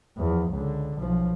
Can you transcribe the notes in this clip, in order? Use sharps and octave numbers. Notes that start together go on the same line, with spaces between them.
E2 F3
C#2 D3
B1 F3